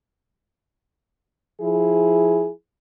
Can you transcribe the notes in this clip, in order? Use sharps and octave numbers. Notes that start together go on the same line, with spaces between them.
F3 E4 G#4